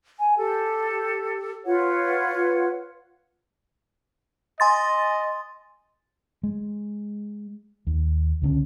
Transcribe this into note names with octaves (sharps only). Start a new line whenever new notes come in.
G#5
G4 A4
F4 B4 C#5 F#5
D#5 G#5 C6 A6
G#3
D#2
C#2 D3 C#4